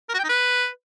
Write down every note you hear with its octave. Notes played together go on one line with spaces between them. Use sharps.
A#4
F#4
G5
D#4
B4